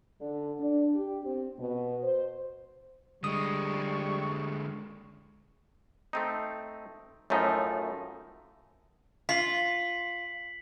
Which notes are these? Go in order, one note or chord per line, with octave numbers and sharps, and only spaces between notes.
D3
D4
G4
C4
B2
C5
D3 G3 G#3 C#6 D#6
A3 C4 D#4
F#2 A2 F3 A3 D#4
F4 B6 C7 F#7